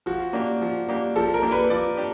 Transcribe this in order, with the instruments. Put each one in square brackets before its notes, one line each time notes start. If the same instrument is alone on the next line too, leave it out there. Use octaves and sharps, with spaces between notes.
[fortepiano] F3 [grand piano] F#4
[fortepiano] A#3 D4 G4
F3
A#3 D4 G4
[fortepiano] F3 [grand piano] A4
[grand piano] A#4
[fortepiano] A#3 D4 G4
[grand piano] B4
[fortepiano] F3 [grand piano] D5
[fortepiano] D4 G4